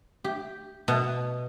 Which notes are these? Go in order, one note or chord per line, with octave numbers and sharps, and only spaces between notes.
G4
B2